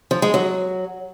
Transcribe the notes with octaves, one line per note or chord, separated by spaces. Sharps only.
F3
G#3
F#3